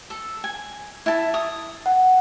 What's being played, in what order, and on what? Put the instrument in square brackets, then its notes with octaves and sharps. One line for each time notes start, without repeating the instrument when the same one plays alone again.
[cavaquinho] A4
G#5
E4 A5
D#6
[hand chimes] F#5